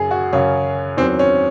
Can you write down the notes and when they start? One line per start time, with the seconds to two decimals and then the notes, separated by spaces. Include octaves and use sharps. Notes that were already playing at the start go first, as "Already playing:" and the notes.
Already playing: F#2 C#3 F#3 G#4
0.11 F#4
0.33 F#2 C#3 F#3 C#4
0.97 E2 D#3 F#3 C4
1.19 C#4